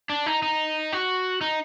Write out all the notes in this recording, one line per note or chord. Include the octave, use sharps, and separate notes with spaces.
D4
D#4
D#4
F#4
D#4